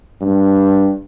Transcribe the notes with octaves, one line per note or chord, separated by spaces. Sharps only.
G2